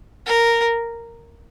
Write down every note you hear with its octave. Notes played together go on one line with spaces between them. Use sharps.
A#4